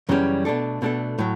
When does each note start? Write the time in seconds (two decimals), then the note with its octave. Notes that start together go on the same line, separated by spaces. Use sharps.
0.09 F#2 C#3 E3 G3 C#4
0.45 B2 A3 D4 A4
0.82 B2 A3 D4 A4
1.19 A2 F#3